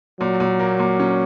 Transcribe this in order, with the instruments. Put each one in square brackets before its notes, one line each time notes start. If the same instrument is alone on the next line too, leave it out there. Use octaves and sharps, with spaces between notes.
[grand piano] A#2 [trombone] F#3
[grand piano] A#2
A#3
A#2
C#4